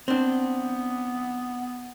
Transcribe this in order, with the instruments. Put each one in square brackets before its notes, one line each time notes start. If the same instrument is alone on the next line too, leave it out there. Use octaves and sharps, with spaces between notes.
[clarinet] B3 [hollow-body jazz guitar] C4 D4